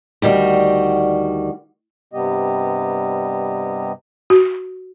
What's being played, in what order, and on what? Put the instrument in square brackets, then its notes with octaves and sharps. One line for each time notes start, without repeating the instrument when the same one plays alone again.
[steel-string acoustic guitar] D2 D#3 G3 F#4
[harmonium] G2 C3 G3 B3 G4 D#5
[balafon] F#4